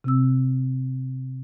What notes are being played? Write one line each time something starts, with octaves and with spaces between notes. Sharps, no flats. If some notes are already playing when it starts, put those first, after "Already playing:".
C3 C4 E6